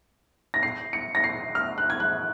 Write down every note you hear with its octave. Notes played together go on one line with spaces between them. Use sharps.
A#6
C7
C#7
A#6
C7
F6
F#6
G#6
F#6